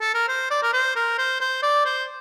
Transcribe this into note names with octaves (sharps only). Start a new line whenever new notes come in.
A4
A#4
C5
D5
A#4
C5
A#4
C5
C5
D5
C5